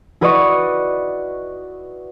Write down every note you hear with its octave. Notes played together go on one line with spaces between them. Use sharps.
E4 F#4 B4 D5 D#5 C#6